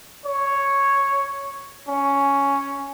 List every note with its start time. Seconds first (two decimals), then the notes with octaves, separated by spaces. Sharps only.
0.25 C#5
1.88 C#4